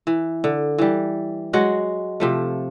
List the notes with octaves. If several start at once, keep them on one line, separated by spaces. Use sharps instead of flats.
E3
D3
E3 G3
F#3 G#3 F#4 F#5
C3 F3 A3